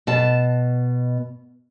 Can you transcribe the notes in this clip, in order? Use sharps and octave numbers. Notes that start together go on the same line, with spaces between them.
B2 A5